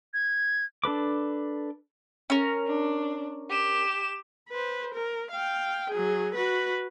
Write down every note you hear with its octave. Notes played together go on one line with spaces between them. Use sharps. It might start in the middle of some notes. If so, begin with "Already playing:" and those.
G#6
D4 A4 B4 D6
C#4 A#4
D4
G4 E7
B4 C5
A#4
F5 G5
F#3 G#4
F#4 B4